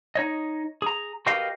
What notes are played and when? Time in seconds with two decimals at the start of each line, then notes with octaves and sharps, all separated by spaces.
0.15 D#4 C#5 D#5
0.82 G#4 A#5
1.26 F#4 G4 A#4 B4 D#5 F5